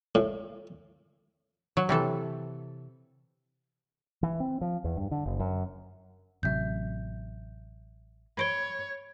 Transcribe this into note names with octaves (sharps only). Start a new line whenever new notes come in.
A2
F#3
C3 E3 A4
E3
C4
F3
E2
G2
D3
F#1
F#2
A1 C3 F#3 E5 G6
C#5 B5 D7 G7